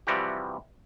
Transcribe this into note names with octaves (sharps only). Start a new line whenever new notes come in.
C3 E3 F3 G3 F#4 G4